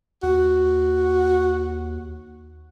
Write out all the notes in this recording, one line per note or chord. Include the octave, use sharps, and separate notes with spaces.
D#2 F#4